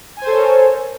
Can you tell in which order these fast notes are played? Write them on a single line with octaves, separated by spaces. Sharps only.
G#5 C5 A4 C#5 A#4